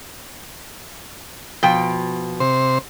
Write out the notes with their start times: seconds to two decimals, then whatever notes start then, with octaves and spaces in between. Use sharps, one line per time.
1.63 B2 F3 G5
2.40 C3 C5